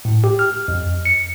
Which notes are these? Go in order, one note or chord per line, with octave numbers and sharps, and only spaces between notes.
A2
G4
F6
F2
C#7